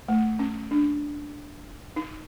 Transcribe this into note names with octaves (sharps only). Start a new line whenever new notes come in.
A3
C#4
D4
D#4